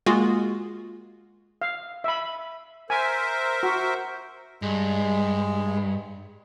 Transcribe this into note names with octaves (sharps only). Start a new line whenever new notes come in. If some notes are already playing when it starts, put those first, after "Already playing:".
G#3 A#3 F4 F#4 G#4
F5
E5 B5
A#4 C5 E5 G#5
F#4
G2 G#3